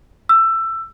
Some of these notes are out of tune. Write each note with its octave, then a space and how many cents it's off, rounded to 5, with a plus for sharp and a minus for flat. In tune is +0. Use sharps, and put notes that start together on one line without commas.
E6 +20